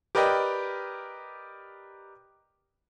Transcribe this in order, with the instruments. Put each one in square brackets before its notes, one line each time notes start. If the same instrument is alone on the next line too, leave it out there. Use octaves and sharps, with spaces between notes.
[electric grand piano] G4 A#4 B4 D5 D#5 G5